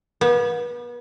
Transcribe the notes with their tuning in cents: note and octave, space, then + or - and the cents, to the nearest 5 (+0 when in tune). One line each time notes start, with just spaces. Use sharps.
B3 -35